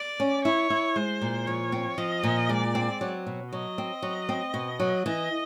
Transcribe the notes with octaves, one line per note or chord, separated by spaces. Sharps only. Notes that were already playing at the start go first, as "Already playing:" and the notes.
Already playing: D5
C#4
E4 C#5
E4
G#3 C5
A#2
F3 C#5
C4
F3 D#5
A#2
G#3 D5
C4
F#3
B2
F#3 D#5
C4
F#3
C4
B2
F#3
E3 D#5